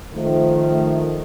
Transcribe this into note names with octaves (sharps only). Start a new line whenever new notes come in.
D#3 F3 A3